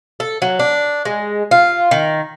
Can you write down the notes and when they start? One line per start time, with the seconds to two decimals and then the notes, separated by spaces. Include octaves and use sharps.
0.20 A4
0.42 F#3
0.59 D4
1.05 G#3
1.51 F4
1.91 D#3